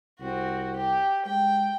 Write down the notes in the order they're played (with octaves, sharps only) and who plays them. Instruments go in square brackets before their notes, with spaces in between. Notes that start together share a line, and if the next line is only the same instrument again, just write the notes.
[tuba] C2 [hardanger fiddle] C4 F#4
[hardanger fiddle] G4
[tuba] G#3 [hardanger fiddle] G5